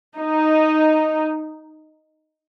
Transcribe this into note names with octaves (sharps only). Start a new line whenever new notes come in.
D#4